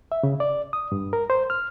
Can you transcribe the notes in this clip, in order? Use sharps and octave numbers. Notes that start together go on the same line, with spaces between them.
E5
C#3
D5
D#6
G2
A#4
C5
F6